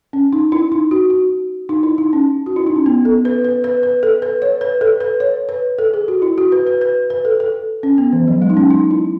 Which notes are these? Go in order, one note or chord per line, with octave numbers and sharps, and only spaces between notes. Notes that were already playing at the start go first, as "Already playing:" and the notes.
C#4
D#4
E4
D#4
F#4
F#4
D#4
E4
D#4
C#4
F#4
E4
D#4
C#4
B3
A4
B4
B4
B4
B4
A4
B4
C#5
B4
A4
B4
C#5
B4
A4
G#4
F#4
E4
F#4
B4
B4
B4
B4
A4
A4
C#4
B3
E3
F#3
G#3
D#4
C#4
D#4
E4